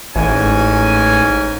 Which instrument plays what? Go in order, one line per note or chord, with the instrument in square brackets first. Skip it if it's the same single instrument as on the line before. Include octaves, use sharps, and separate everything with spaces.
[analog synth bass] A1 [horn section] G#2 C#4 G#5